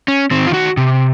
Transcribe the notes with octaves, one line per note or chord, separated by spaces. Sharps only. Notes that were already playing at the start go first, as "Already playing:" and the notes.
C#4
D#3 C4
F4
F#4
C3